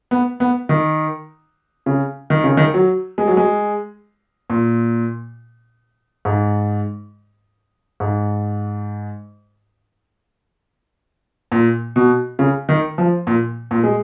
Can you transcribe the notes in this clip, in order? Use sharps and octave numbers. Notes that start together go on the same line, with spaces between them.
B3
B3
D#3
C#3
D#3
C#3
D#3
F#3
G#3
F#3
G#3
A#2
G#2
G#2
A#2
B2
C#3
D#3
F3
A#2
A#2
G#3